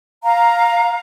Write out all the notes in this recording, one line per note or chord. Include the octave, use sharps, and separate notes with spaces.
F5 A#5